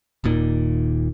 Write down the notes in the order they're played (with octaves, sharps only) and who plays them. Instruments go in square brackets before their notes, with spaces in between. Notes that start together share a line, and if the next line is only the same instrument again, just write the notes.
[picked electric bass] D#1 D#2 A#2 D#3